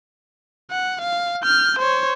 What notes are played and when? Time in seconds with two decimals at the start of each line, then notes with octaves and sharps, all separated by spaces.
0.71 F#5
1.02 F5
1.43 F6 G6
1.80 C5 C#5